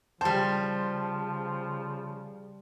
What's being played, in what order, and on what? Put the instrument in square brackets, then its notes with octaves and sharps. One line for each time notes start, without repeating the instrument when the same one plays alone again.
[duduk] C#3 [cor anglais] F3 [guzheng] G3 C5 [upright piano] A5